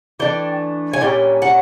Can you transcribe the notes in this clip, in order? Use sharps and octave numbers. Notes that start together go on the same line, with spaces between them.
E3 A3 D4 G5
G#5
A#2 G3 C#4 G5
F#5